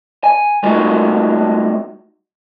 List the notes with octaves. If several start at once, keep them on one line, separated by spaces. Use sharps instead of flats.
G#5
G3 A3 A#3 D#4 F4 F#4